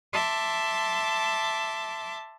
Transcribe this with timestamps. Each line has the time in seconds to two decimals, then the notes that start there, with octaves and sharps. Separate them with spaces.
0.12 E5 A5 C6 D6